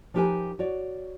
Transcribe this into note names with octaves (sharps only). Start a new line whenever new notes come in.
F3 D#4 G4 A#4 B4 G#5
F#4 C#5 D5